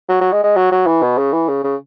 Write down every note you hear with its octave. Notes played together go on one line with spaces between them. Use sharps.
F#3
F#3
G#3
G#3
F#3
F#3
E3
B2
C#3
E3
C#3
C#3